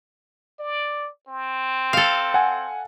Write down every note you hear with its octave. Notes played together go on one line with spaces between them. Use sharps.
D5
C4
A4 F5
F#5 G#5